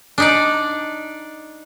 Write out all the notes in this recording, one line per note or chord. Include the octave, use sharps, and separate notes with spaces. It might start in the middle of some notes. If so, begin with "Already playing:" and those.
D4 D#4 D5